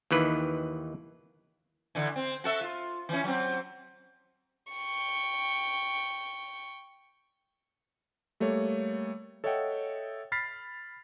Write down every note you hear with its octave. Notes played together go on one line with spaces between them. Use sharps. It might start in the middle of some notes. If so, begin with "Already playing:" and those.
D#2 D#3 E3 B4
D3 E3
C4
F#4 A4 E5
F4
E3 C#4
F#3 C4
G5 C#6
G3 A3 A#3 A4 C#5
A4 C#5 D#5 E5 F#5 G5
B5 F6 A6 B6 C7